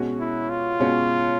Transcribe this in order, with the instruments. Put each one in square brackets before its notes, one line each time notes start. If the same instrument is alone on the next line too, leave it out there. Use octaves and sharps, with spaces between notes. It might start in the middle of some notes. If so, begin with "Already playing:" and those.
Already playing: [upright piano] B2 G#3 C#4 F#4
[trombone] E4
F4
[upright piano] B2 G#3 C#4 F#4